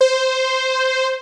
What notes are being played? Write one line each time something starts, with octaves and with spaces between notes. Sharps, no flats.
C5